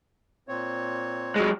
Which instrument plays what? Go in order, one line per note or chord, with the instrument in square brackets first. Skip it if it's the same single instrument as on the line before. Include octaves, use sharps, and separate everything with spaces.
[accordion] A#2 C4 C#5
[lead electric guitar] F#3 G#3